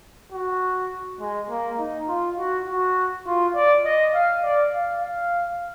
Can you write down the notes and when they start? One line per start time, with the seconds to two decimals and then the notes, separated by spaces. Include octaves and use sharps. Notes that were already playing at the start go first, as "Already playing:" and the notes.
0.32 F#4
1.20 G#3
1.49 A#3
1.79 D#4
2.08 F4
2.38 F#4
2.67 F#4
3.26 F4
3.55 D5
3.85 D#5
4.14 F5
4.43 D5
4.73 F5
5.03 F5